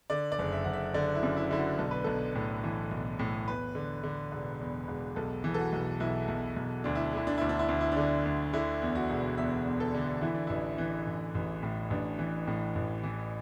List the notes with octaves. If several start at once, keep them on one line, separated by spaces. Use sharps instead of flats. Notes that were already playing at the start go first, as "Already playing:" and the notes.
D3 D5
D5
F#1
E5
F#1 F#5
E5
D3 D5
E4
F#2
E4
D3 E4
F#4
B1 A4
B4
B1 A4
A2
E3
B1
A2
E2 B4
D3
D3
E1
E2
E1
B1 A4
E3
A4
F#4
B1
B1 E4
B1
B1
D2 D4
E4
D4
D3 E4
D4
D2 E4
D4
E4
D2 D4
E4
D3 D4
D2
D3 E4
E2
F#4
E1
E2 E5
E2
A4
D3
E3 E4
D4
A1 E4
E3
A1
A1
A2
A1 D4
E3
A2
A1
E3